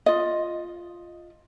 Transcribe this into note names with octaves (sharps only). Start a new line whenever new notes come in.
F4 D#5